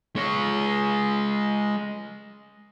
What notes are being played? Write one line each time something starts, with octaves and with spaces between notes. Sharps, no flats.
G#3 C#5